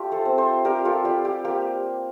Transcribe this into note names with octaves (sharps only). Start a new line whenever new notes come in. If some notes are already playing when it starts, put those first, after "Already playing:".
Already playing: A3 F4 G4 D5
A4 C5
C4
A4 C5
G3 G4 A#4
F4 A4
G3 G4
G4
A#3 G4